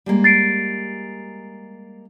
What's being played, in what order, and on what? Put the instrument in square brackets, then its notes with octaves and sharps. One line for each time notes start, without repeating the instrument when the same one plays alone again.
[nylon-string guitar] G3 G#3 A#3
[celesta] A6 C7 D7